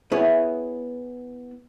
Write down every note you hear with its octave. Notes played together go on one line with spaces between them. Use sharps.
B3 E4 G#4 C#5